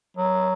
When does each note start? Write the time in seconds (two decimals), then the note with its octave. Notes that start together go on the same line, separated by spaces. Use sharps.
0.17 F#3